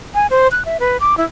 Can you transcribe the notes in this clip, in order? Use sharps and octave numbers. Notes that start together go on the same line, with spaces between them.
G#5
C5
F#6
E5
B4
D6
E4